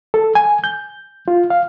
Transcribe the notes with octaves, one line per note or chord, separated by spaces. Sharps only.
A4
G#5
G6
F4
F5